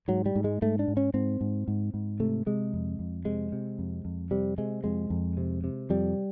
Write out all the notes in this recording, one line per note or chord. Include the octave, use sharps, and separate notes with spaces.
G#2 F#3
G3
G#2
G#3
G#2 A3
D4
G#2
C#4
G#2 C4
G#2
G#2
G#2
C3 A3
C3 G#3
F2
F2
C3 G#3
C3
F2
F2
C3 G3
C3 G#3
F2 G#3
F2
C3
C3
F2 G3